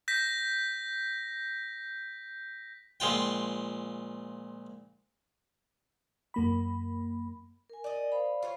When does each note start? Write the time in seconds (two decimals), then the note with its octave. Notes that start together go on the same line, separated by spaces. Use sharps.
0.08 G6 A#6 B6
3.00 A#1 G#3 F4 G5
6.34 F#2 A#3 B5
7.70 A#4 G#5
7.84 D5 D#5
8.12 C5 F5 B5
8.43 F4 C#5